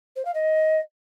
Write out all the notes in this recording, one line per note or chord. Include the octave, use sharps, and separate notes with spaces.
C5
F5
D#5